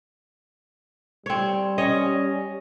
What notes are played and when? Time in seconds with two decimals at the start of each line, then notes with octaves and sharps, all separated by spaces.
1.26 G3 C4 C#5
1.78 C#4 C#5 D#5